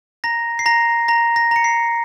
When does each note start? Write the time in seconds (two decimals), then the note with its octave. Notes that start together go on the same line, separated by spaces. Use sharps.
0.24 A#5 A#6
0.59 C7
0.66 A#5 A#6
1.08 A#5 A#6
1.36 A#6
1.51 A#5 C#7
1.64 C7